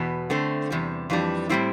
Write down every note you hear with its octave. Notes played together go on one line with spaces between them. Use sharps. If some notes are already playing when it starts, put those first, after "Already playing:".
Already playing: E2 B2 B3
D3 A3 C4
E2 C3 G3
F2 E3 G3 D4
A2 G3 C4 E4